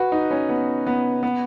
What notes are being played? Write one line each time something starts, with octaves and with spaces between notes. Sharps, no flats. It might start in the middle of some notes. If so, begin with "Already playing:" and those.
Already playing: F#4 B4
D#4
C#4
B3
B3
B3